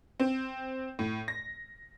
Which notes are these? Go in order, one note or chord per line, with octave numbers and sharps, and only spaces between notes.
C4
A2
A#6